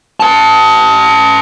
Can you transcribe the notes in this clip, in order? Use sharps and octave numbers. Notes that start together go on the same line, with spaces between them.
B4 A5